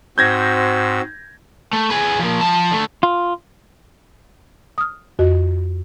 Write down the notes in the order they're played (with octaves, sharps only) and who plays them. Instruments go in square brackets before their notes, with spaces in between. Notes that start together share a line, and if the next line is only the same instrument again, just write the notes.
[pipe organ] G#2 [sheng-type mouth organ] C4 F#4 E6 [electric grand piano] G6 G#6 A#6
[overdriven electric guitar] A3
G#4 B4
F3 A#3
F3 A5
D3 A3
[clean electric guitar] F4
[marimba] D#6 F6
F2 F#4 D#5